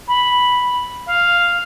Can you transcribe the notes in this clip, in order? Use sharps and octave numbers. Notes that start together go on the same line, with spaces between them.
B5
F5